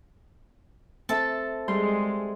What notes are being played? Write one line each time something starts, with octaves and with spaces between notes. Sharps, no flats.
C4 A4 E5 A5
G3 G#3 C6 G6